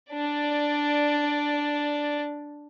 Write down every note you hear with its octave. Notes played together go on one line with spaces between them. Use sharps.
D4 D5